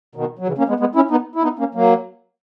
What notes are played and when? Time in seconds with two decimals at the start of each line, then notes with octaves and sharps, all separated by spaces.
0.15 B2 D#3
0.39 F#3
0.47 C#3 E3
0.58 A#3 C#4
0.68 G#3 B3
0.80 G#3 B3
0.95 C#4 E4
1.11 B3 D#4
1.35 E4
1.43 B3 D#4
1.59 A#3 C#4
1.75 F#3 A#3